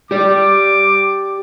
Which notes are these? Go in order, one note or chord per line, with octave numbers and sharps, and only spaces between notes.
G4 D5 D6